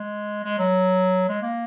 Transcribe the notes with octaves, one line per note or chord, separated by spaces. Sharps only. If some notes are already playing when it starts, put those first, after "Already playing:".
Already playing: G#3
G#3
F#3
G#3
A#3